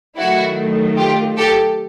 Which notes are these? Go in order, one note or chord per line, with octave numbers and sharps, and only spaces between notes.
D#3 F#3 A3 E4 F#4
F4 G4
G4 A4